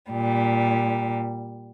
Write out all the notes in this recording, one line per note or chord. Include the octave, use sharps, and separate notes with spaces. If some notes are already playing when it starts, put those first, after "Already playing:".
A#2 G3